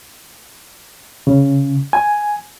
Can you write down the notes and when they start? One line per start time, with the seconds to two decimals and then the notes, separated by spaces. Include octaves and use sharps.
1.27 C#3
1.93 G#5